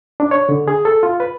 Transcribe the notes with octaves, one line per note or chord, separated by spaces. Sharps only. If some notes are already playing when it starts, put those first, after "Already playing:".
D4
C#5
D3
G#4
A4
F4
B4